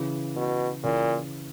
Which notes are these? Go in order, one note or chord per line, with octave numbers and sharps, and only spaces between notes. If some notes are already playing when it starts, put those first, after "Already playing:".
Already playing: C#3 E3
B2
A#2 C#3 E3